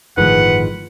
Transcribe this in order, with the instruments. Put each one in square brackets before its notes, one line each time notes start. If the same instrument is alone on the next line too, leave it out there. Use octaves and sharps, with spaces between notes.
[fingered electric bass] G1 A2 [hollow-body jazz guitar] D#3 F3 G#3 [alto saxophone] B4 [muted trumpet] F#5